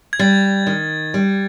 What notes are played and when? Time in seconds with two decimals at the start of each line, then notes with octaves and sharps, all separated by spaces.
0.13 G#6
0.19 G3 A6
0.67 D#3
1.14 G3